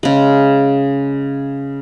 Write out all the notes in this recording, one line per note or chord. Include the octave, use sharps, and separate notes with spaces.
C#3 G#3